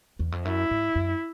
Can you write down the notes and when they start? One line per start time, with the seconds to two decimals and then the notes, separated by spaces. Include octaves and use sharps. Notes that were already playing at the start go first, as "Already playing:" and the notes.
0.19 E2
0.32 F2
0.45 F#2 E4
0.71 G#2
0.95 F#2